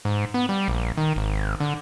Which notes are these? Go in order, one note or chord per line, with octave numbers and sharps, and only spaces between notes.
G#2
B3
G3
A#1
D#3
G#1
D3